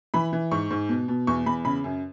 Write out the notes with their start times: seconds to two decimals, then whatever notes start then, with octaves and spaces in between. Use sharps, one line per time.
0.14 E3 B5
0.33 E3
0.51 G#2 C#6
0.71 G#2
0.89 B2
1.08 B2
1.27 E2 C#6
1.46 E2 B5
1.65 C#3 B5
1.84 F#2